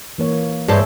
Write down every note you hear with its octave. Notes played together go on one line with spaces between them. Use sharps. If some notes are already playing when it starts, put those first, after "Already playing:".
E3 A#3 C#5
G2 G#4 C5 C#5 E5 A5